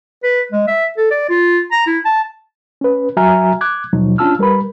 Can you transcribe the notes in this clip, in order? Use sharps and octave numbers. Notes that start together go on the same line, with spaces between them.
B4
G#3
E5
A4
D5
F4
A#5
E4
A5
C#4 B4
F#3 F#4 E5 G#5 A#5 F6
D6 F#6 G#6
D#2 B2 F3 F#3 D#4
C#4 D4 F4 A5 E6 F6
G3 A#4 B4 B5